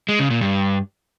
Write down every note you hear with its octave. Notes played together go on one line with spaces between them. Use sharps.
G#3
C#3
A#2
G2